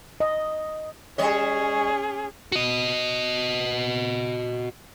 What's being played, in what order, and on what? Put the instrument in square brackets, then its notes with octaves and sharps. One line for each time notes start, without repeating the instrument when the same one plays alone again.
[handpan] D#5
[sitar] G3 C#5 D#5 [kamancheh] C#4 G#4
[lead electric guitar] F#4 D#5